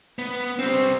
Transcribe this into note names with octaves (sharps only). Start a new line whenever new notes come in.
B3
G3 C4